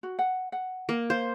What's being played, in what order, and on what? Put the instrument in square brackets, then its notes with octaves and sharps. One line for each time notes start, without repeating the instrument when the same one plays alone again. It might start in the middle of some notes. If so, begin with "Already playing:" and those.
[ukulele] F#4
F#5
F#5
[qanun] A#3
[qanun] C5 [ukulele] F5